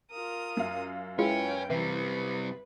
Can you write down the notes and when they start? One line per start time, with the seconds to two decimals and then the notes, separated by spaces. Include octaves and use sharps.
0.10 F4 A#4 D#6
0.57 F#2 F5
1.19 G#3 C#4 E4 F4 B4 G5
1.70 C3 E3 G3 B4